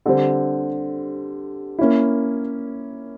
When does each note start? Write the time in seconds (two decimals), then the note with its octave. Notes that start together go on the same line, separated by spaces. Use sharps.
0.06 D3 G3 C4
1.79 A#3 C#4 E4